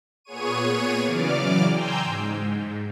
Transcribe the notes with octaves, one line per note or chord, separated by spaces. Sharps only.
A#2 B3 G#4 C#5 C#6 D#7
C#3 E3 F#3 D5 D6 F6
G5 G#5 A#5 C6 E6 G6
G#2